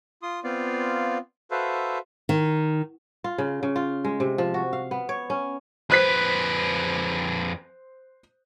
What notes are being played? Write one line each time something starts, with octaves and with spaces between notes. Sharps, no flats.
F4 C6 D#6
B3 C4 F4 D5 F5
F#4 A4 B4 C5 E5 F5
D#3
F4
C#3
C#3
F4
G#3
C3
F3
F#4
F5
B3
C#5
C#4
F2 B4 C5 F#6 B6